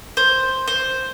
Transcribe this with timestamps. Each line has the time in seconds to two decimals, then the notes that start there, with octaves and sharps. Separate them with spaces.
0.17 C5
0.68 C5